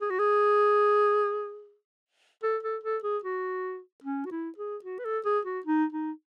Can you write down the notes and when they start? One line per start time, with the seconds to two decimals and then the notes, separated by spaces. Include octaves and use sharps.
0.01 G#4
0.10 F#4
0.19 G#4
2.43 A4
2.63 A4
2.83 A4
3.03 G#4
3.23 F#4
4.04 C#4
4.26 F#4
4.31 E4
4.58 G#4
4.84 F#4
4.99 B4
5.05 A4
5.25 G#4
5.45 F#4
5.66 D#4
5.92 D#4